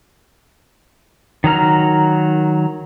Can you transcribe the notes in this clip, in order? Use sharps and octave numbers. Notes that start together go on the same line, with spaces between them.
D#3 F#3 A#5 F6